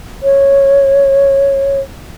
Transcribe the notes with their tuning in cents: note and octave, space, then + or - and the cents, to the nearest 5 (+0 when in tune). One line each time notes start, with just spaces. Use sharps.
C#5 -10